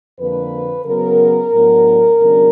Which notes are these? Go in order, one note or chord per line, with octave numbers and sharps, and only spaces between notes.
F2 D3 F3 A#3 B4
C#3 F#3 B3 A#4
A2 F#3 B3 D4
D#2 C#3 F#3 B3 D4